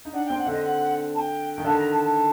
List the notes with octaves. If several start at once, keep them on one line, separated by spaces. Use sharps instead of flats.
D#4
D4 F#5
G5
C4
F#5
D3 D#5
F#5
A5
G5
D#3 G5
D3 A5
A#5
A5
A5